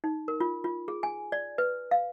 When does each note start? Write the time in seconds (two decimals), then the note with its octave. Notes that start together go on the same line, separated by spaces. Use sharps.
0.04 D#4
0.28 A#4
0.40 F4
0.64 F4
0.88 G#4
1.03 G#5
1.32 D5
1.58 B4
1.91 F5